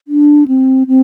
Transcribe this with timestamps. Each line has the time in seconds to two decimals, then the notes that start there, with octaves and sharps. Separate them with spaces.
0.08 D4
0.48 C4
0.88 C4